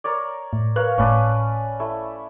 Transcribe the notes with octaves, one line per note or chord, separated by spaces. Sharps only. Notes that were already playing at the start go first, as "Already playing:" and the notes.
A#4 C#5 D5
A2
A#4 B4 C#5 F5 F#6
G1 A2 C#4 B4 D5 A5
A3 E4